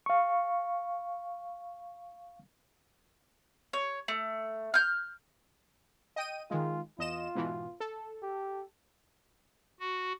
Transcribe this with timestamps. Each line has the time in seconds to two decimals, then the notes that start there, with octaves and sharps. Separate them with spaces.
0.06 F5 C#6
3.73 C#5
4.08 A3
4.74 F6 G6
6.16 D#5 G5 D#7
6.51 D#3 G#3 F4
6.99 E2 F4 D#5 E7
7.35 G#2 B2 E3
7.80 A4
8.23 G4
9.80 F#4